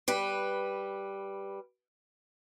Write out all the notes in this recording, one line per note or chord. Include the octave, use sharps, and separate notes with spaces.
G3 B4